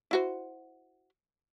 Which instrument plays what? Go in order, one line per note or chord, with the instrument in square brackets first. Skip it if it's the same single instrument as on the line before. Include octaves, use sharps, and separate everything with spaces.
[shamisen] E4 F#4 C5